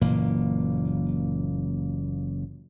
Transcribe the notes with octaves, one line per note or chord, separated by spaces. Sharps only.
F#1 A#2 E3 A#3